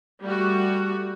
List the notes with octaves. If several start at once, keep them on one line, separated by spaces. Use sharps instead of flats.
G3 A3 F#4